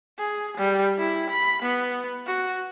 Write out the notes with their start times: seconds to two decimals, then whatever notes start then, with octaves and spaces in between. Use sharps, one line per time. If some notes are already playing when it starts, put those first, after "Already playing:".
0.19 G#4
0.58 G3
0.98 E4
1.30 B5
1.62 B3
2.27 F#4